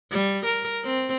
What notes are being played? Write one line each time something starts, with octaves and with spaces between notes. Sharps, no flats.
G3
A#4
C4